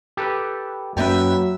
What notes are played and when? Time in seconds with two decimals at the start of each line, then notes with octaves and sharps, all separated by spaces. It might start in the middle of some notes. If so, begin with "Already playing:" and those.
0.17 G4 A4 B4
0.97 F#2 F#3 A#3 C#4 B4 E5 G5